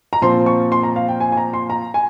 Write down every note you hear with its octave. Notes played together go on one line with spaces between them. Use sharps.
A#5
A#2 F3 C4 C6
C#6
C6
A#5
F5
G5
G#5
G#5
A#5
C6
A#5
G#5